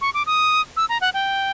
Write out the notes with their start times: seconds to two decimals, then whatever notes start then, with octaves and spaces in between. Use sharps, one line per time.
0.01 C#6
0.14 D6
0.26 D#6
0.77 E6
0.89 A#5
1.01 F#5
1.14 G5